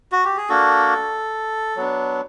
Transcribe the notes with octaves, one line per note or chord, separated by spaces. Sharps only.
F#4
G4
G#4
A#3 D4 F#4 A4
F#3 B3 D4